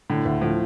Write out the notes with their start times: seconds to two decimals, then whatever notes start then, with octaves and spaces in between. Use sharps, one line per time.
0.10 A2 D3
0.25 D2
0.41 A2 F3